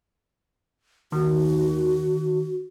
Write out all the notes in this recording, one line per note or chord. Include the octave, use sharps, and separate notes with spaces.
D#2 D#3 F#4